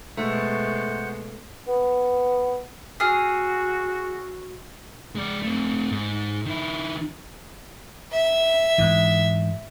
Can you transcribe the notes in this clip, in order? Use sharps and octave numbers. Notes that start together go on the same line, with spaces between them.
B2 G#3 A3 C5 F#5
B3
F#4 G#4 E6 F6 C7
G#3 D5
A3 C4
G#2
D#3 E4
E5
G#2 E3